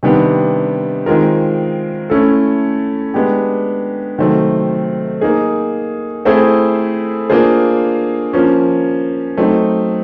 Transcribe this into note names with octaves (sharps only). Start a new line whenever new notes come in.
C3 D#3 G3 B3 D4
D#3 G#3 C4 F4 A#4
A3 C#4 E4 A4
G#3 B3 D4 G4
C3 D#3 F#3 A3 C4
A#3 D#4 G#4
A3 C4 E4 G#4 C5
A#3 D4 F4 G#4 C5
F3 A#3 C#4
F#3 A3 C4 D#4